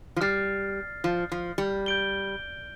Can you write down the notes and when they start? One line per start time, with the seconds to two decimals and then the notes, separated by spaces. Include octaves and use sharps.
0.16 F3
0.21 G3 F6 A6 C7
1.04 F3
1.32 F3
1.58 G3
1.86 G6 D7 G7